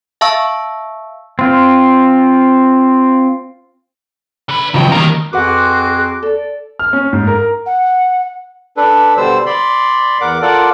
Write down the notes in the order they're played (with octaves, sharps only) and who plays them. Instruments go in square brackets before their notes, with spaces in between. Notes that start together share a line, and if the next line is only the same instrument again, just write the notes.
[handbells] E5 F5 A5 C#6 E6
[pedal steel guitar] C4 F4
[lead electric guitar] D3 B4
[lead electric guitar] F#2 G5 [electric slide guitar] C#3 F3 F#3
[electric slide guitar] D#3 A#5 [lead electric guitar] G3 A#3
[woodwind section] F2 C6 D6 [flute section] F#4 G#4 F#6 [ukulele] B4 F#5
[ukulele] A4 [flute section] D5
[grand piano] F6
C#4
G#2
A#4
[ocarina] F#5
[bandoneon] D4 A4 B4
B2 D3 G3 C5 E6
D5 B5 C6
E2 A#4 F#5 D6
F4 A4 A#4 D5 F#5